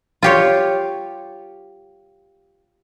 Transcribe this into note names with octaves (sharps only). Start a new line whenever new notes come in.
F4 G4 C#5